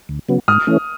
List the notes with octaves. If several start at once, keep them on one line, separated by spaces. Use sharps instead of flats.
D2
C#3 F#3 B3
G#2 D#6 F6
E3 A3 C#4